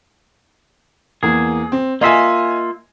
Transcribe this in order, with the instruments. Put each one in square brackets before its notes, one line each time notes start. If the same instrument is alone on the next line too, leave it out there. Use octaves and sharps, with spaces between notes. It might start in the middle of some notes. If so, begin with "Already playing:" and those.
[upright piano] E2 A#3 [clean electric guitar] G#4
[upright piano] C4
[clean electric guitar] A#3 F4 E5 [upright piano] D#5 G#5